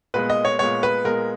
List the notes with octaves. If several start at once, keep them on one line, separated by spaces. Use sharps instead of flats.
A#2 G#3 B3 B4
D#5
C#5
A#2 G#3 B3 C#5
B4
A#2 G#3 B3 A#4